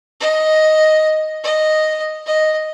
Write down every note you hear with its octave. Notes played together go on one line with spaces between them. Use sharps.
D#5
D#5
D#5